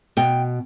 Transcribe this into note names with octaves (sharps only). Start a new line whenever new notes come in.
B2 G5